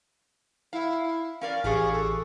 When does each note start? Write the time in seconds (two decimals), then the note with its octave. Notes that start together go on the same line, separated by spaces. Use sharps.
0.73 E4 F5
1.41 C#4 A#4 D5 F5
1.64 A1 D4 G4 G#4 F5 C#6
1.92 A4